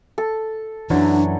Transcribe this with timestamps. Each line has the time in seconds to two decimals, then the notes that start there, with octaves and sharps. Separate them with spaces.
0.18 A4
0.90 F#2 D3 E3 F#3 D4